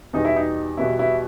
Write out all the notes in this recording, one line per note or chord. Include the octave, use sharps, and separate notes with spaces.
E2 B2 G3 D#4
E4
D#4
E2 B2 G3 E4
E4